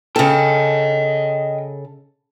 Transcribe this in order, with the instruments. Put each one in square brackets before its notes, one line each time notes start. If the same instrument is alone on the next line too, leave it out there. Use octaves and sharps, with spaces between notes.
[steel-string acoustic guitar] C#3 A4 [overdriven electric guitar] D#5 G5